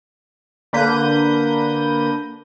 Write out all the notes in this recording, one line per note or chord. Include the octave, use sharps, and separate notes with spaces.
D3 A#3 B4 G6 A#6 D#7